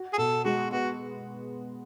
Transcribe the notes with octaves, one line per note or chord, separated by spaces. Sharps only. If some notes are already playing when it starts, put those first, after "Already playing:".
Already playing: F#4
G#4
B2 A4
G#3 F#4
B3 F#4